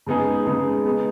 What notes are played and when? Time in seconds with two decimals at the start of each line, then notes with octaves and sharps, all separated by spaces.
0.07 C#3 G#3 B3 D#4 G#4
0.46 C#3 G#3 B3 D#4 G#4
0.85 G#3 B3 D#4